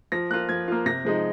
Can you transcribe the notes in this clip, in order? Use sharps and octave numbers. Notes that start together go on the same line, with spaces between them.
F3 A#6
A#3 F4 F#6
F3 G#6
A#3 F4
C3 A#6
F3 G#3 D#4